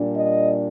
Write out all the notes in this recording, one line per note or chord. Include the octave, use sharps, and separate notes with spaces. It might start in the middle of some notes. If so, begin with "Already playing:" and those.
Already playing: A#2 G3 D4
D#5